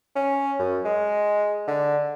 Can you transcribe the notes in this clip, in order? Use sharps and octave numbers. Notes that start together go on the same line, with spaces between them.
C#4
F#2
G#3
D3